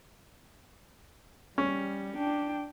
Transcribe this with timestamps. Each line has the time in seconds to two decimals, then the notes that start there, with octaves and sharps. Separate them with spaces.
1.58 G3 C#4
2.16 D4 G5